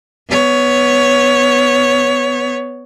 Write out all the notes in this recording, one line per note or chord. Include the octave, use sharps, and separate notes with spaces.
B3 C#5